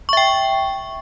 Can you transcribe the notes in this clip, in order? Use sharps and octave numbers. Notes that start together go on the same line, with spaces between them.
E5 G5 C#6